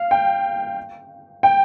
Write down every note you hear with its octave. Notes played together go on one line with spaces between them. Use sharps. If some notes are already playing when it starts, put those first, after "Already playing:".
Already playing: F5
G5
G5